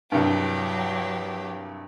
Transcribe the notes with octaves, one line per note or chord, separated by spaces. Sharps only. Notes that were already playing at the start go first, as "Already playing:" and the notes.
C2 G2 F#3 G4